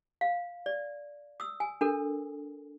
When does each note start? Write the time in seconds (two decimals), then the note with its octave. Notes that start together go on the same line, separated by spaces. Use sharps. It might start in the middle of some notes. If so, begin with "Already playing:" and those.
0.21 F5
0.66 D5
1.40 D#6 E6
1.60 G#5
1.81 D4 A4 A#4